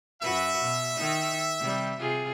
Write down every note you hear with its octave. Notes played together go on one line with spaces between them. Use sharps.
F#2 F#4 B4 E5
B2
D#3 D#4
C3 G3
C3 F4 G#4